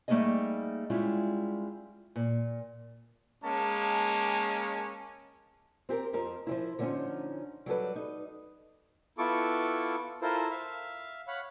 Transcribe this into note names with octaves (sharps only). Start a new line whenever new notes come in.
G3 A3 A#3 D#4 G#4 D#5
G3 G#3 C#4 E4 F4
A#2
G#3 A#3 C#4 A5
C4 G4 G#4 A#4
F2 F3 A#4
F3 F#3 E4
D3 F3 A3 C4 C#4 D#4
F#3 G3 A4 B4
D#4
B3 E4 F4 A4 C#6 D6
E4 F4 A4 A#4 C5
E5 F5
C#5 F5 F#5 B5